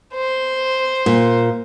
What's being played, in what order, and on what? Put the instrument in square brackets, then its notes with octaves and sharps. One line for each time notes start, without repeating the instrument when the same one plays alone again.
[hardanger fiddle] C5
[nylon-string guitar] A#2